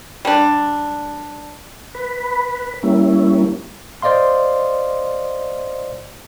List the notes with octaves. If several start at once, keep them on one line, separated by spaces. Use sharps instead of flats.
G3 D4
B4
G3 A#3 C#4 E4
C5 D5 D#5 F5 C6